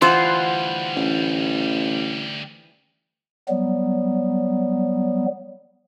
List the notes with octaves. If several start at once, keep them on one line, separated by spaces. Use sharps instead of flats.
D2 E3 G3 F4 C5 F#5 C6
A1
F#3 G3 B3